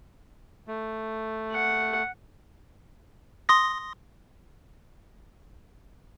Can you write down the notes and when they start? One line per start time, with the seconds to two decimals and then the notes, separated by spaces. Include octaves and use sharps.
0.68 A3
1.52 F#5
3.49 C6 D#6 A#6